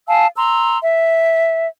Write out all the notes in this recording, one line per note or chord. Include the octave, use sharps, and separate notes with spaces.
F5 G#5 A5 E6
A#5 C6 E6
E5